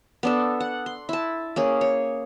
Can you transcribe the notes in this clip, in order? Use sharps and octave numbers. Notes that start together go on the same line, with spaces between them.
B3 D4 A4
F#5
C6
E4 A5
A#3 C#4 G#4
C#5